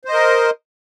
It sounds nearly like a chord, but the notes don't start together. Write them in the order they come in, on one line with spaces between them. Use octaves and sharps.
C5 D#5 A#4